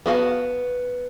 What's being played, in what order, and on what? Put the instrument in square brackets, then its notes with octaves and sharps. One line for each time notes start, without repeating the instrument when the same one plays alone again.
[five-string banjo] B3 F#4 F5 A5